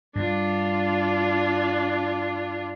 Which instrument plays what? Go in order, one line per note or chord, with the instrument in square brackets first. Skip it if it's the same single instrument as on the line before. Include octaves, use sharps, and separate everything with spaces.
[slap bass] G2 G3 [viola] D4 F4